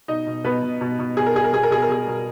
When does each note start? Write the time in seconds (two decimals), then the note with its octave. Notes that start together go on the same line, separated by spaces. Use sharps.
0.08 B2 D#4 D#5
0.27 B2
0.44 B2 B3 B4
0.63 B2
0.81 B2
0.99 B2
1.17 B2 G#4
1.26 A#4
1.35 B2 G#4
1.44 A#4
1.52 B2 G#4
1.63 A#4
1.71 B2 G#4
1.82 A#4
1.89 B2 G#4
2.07 B2